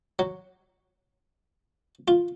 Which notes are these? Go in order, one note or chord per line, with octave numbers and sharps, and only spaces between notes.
F#3
F4